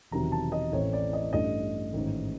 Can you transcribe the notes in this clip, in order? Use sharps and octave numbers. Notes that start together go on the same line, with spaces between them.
E1 E2 C3 D#3 F#3 A#5
A5
D#5
A1 A2 E3 A3 C4 C#5
D5
D#5
A1 G2 E3 A3 D#5
A1 G#2 D#3